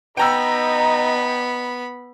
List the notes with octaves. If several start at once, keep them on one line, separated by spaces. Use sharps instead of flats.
B3 D#4 G5 A#5 B5 E6